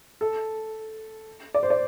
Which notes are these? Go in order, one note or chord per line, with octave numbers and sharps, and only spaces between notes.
A4
D5
C5
D5